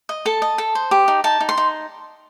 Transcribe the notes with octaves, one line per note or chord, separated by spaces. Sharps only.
D#5
A4 A5
D#5
A4
C5
G4
D#4
D#4 A5
D#4
C6
D#4